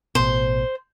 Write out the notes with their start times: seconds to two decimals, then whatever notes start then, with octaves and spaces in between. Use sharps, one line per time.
0.15 A1 B2 C5